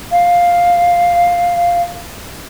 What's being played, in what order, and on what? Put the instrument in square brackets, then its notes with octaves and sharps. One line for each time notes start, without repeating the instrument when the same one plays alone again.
[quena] F5